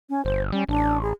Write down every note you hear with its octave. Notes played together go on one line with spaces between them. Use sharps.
C#4
G1 C5
G3 C#4
A1 D4
G#4